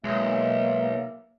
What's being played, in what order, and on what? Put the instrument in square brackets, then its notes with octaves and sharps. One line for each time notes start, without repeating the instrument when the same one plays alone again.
[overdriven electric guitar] B1 [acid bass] G#3 [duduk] A#3 [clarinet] E5